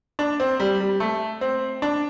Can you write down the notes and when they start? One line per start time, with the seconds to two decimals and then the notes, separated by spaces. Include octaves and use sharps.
0.19 D4
0.40 C4
0.60 G3
0.80 G3
1.00 A3
1.41 C4
1.82 D4